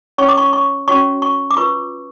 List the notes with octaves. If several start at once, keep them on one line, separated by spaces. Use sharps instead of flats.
C#4 G#4 C#5 C#6
D6
C#6
C#6
C#4 F#4 C#5 C#6
C#6
D6
F4 B4 C#6